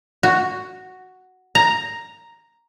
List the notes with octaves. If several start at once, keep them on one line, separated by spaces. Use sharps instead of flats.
F#4
A#5